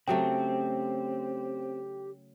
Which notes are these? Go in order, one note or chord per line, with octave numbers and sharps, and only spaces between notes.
C#3 F#3 A3 C4 G4 G5